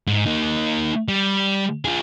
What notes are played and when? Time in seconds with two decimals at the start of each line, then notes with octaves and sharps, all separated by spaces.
0.07 G#2
0.26 A#3 D#4
1.08 G3
1.85 F4 G#4